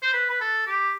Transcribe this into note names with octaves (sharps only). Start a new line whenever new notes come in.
C5
B4
B4
A4
G4